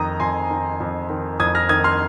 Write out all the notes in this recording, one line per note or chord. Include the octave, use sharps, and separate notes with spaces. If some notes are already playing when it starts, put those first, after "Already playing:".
Already playing: F2 D#3 A#5 D#6
F2 G#5 C6
D#3
F2
D#3
F2 D#6 G#6
F6 A#6
D#3 D#6 G#6
C6 F6